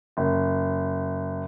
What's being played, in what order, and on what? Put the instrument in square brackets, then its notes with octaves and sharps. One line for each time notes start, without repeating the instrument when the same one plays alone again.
[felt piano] F#1